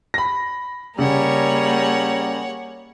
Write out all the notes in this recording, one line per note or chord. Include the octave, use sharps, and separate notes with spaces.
B5 A#6
C#3 G3 A#3 G#4 C#5 F#5 A#5